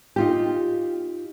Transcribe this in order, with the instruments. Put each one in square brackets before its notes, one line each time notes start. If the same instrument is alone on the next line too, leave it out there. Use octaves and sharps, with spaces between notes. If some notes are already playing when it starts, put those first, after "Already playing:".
[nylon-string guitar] D#4 F4 G4